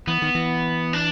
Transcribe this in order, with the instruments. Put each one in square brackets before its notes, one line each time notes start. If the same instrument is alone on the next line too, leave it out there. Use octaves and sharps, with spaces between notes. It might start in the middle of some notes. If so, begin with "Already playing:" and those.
[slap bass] E3 [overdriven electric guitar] B3
[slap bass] D#3
E3
[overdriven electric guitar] D4